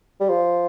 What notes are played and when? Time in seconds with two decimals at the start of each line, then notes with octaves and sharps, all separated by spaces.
0.21 G3
0.29 F3